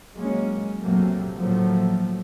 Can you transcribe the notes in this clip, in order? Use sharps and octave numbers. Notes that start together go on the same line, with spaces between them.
F#3 G#3 A#3 C#4
C#2 F#2 C3 F#3 A3 A#3
A2 D3 F3 F#3 A3 A#3